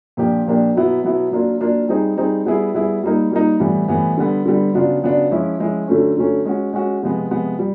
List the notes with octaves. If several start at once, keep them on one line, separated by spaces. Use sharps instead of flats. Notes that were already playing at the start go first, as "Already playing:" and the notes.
A#2 F3 A#3 D4 G4
A#2 F3 A#3 D4 G4
B2 F#3 B3 E4
B2 F#3 B3 E4
F#3 A#3 D4 F4
F#3 A#3 D4 F4
G3 C4 D#4 G#4
G3 C4 D#4 G#4
G3 B3 E4 G#4
G3 B3 E4 G#4
G3 A#3 D#4
G3 A#3 D#4
A2 E3 G3 B3
A2 E3 G3 B3
D3 G3 B3
D3 G3 B3
C#3 F#3 B3 D4 F4
C#3 F#3 B3 D4 F4
F3 G#3 C#4 E4
F3 G#3 C#4 E4
D3 F#3 A3 C#4
D3 F#3 A3 C#4
G#3 C#4 F#4
G#3 C#4 F#4
C3 F3 G#3 B3
C3 F3 G#3 B3
G3